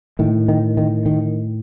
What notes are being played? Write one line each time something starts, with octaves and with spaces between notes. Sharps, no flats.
A2 D#3
D#3
D#3
D#3